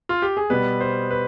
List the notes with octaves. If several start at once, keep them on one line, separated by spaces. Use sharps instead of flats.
F4
G4
G#4
B2 G3 B3 B4
C5
B4